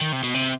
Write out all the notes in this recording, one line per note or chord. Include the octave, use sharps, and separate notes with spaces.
D#3
C3
B2
C3